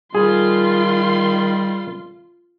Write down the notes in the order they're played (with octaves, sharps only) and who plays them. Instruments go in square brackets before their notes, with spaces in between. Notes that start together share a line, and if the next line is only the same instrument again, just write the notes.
[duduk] D#3 [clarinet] G3 [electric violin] F4 C6 [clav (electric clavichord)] G#4